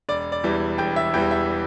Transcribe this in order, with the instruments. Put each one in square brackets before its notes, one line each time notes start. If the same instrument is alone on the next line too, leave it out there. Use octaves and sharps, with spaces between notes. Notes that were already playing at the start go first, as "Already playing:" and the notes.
[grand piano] E1 D5
D5
E2 E3 G3
E1 G5
E5
E2 E3 G3 G5
E5